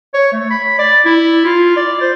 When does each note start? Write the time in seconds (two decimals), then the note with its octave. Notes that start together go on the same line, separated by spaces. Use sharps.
0.14 C#5
0.32 A3
0.50 B5
0.78 D5
1.05 E4
1.45 F4
1.77 D5
2.01 C5